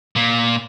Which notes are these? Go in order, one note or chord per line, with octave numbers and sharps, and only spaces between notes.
A#2